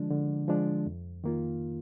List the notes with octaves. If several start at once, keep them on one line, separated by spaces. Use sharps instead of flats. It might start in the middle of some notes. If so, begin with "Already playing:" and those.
Already playing: D3 F3 G#3 D4
D3
F3 G#3 D4
F2
D#3 A#3 F4